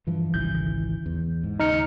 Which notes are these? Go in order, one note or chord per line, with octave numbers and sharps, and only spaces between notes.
G2 E3 F3
G#1 C#2 E3 G6
E2
G#2
D#2 C#3 D#4 F6 C#7